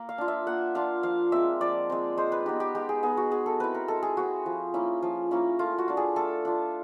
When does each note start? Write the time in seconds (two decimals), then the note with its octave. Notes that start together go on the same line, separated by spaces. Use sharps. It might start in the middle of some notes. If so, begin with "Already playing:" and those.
Already playing: A#3
0.09 F5
0.18 D4 F4
0.28 E5
0.47 A#3 F#5
0.75 D4 F4 F5
1.03 F3 F5
1.32 G#3 C4 E5
1.61 F3 D5
1.90 G#3 C4
2.17 G#3 C5
2.32 B4
2.46 B3 D#4 G4
2.60 G4
2.75 G#3 G4
2.89 G#4
3.03 B3 D#4 G#4
3.17 F#4
3.31 G#3 G#4
3.46 A4
3.60 C4 E4 B4
3.74 A#4
3.88 G#3 A4
4.03 G#4
4.17 C4 E4 F#4
4.46 F3
4.74 A#3 C#4 E4
5.02 F3
5.31 A#3 C#4 E4
5.59 A3 F4
5.78 F#4
5.88 D4 F4
5.97 G#4
6.16 A3 A4
6.45 D4 F4